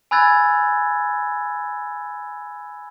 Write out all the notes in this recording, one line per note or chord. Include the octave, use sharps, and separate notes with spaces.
G#5 B5 E6 F#6 G#6 A6